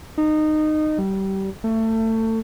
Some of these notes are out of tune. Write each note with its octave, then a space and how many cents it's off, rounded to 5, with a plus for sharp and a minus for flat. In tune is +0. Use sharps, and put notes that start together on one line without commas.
D#4 -20
G3 -25
A3 +25